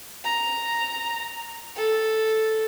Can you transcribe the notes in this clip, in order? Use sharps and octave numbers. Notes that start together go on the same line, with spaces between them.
A#5
A4